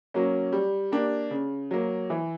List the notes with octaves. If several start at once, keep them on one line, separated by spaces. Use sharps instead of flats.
F#3 A#3 C#4
G3
A#3 D4 G4
C#3
F#3 A#3
E3